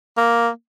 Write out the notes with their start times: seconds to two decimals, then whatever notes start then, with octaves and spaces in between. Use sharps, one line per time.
0.17 A#3